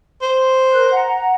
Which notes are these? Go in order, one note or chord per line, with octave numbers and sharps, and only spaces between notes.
C5
A#4 F#6
F#5 A#5